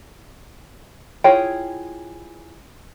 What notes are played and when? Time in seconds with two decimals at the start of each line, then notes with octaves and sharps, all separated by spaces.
1.24 E4 F4 G#4 C#5 G5